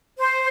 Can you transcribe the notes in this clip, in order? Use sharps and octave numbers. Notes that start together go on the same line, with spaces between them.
C5